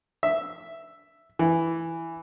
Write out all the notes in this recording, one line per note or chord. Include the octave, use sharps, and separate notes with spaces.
E5
E3